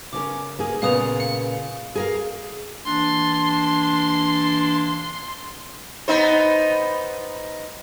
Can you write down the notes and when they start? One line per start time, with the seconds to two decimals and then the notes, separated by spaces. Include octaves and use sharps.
0.13 C#3 C#4 A#4 D6
0.59 A#3 G#4
0.82 A#2 C#3 B3 F5 D#6 F7
1.20 F5 C#7
1.95 G#4 A#4 F5
2.86 E3 A#3 D4 C6
6.08 B3 D#4 C5